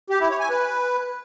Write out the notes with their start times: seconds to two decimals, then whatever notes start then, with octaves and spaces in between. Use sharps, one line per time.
0.10 G4
0.20 E4
0.30 C#5
0.40 G#5
0.50 B4